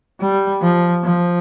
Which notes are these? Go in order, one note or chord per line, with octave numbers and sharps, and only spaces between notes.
G3
F3
F3